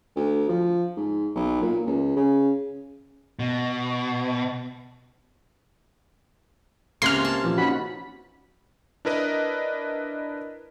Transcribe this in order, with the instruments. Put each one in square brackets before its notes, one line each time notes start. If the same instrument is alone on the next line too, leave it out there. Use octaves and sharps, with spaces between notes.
[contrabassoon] D2
F3
G#2
B1
A#2
C#2
C#3
[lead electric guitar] B2
[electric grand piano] C#2 [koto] C3 A#3 C#4 [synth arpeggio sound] C6 F6
[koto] A5
[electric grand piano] A#2 E3 F3
[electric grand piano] C#4 D#4 [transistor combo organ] F#4 B5
[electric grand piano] D4 E4 A#4 B4 D#5